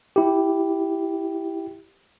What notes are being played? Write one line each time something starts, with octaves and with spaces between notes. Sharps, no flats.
E4 G4